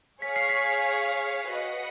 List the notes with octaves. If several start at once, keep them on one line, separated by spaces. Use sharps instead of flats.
G#4 C#5 F5 B6
C7
B6
F#4 B4 D#5 F#5